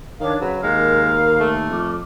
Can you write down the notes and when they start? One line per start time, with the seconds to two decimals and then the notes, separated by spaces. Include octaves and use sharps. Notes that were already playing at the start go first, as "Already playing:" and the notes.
0.20 D#3 D4 C#5 F5
0.40 C#3 F#3 B4
0.63 D#2 G#3 A#4 F5
1.40 A3
1.69 F2 D6 F6